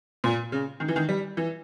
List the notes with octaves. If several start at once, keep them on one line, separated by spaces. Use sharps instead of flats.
A#2
C#3
D#3
E3
D#3
G3
E3